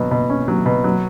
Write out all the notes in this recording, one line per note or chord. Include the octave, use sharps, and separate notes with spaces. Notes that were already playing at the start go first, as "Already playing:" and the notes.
Already playing: B2 F#3
B2
C#4
F#3
B2
F#3